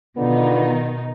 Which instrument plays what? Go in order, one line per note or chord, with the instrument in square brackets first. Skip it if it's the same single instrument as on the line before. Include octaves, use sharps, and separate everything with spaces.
[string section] B2 D#3 D#4 [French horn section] D3 B3 F4